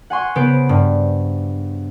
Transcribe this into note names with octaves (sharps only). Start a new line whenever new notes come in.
F#5 G#5 C6 C#6
C#3 B3 C5 D7
G2